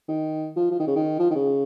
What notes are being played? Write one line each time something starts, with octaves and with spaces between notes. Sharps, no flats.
D#3
F3
F3
D#3
C#3
D#3
F3
D#3
C#3